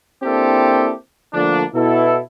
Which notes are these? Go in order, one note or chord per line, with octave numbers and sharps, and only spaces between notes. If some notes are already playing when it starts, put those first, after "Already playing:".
A#3 C4 D4 E4 G4 A4
D3 F3 A3 A#3 D4
B2 E4 A4